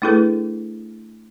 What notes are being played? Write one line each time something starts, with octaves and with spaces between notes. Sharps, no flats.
A3 D4 E4 G#4 A4 B4